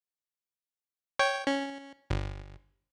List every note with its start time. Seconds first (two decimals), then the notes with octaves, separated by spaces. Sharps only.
1.19 C#5 G5
1.47 C#4
2.10 G1